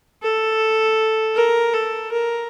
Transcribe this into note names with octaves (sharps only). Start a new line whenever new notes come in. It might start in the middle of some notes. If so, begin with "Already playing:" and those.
A4
A#4
A4
A#4